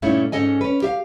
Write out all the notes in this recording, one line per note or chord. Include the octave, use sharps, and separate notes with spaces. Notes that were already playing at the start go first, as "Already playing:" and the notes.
G2 A#2 A3 C#4 D#4 E4
G#2 E3 C#4 A4 D#5 G#5
C#4 B4
G4 E5 F5